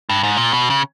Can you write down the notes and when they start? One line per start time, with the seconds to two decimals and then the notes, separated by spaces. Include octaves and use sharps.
0.09 G2
0.23 G#2
0.37 A#2
0.53 B2
0.70 C#3